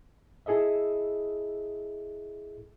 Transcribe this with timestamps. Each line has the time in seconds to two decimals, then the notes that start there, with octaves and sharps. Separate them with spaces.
0.46 E4 G#4 A4 D#5 E5